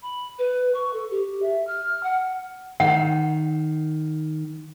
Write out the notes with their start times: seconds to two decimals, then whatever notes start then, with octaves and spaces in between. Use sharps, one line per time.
0.02 B5
0.39 B4
0.74 C#6
0.93 A4
1.11 G4
1.42 E5
1.67 F6
2.03 F#5
2.80 D#3 F#5